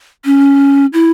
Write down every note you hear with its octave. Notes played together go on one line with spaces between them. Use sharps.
C#4
E4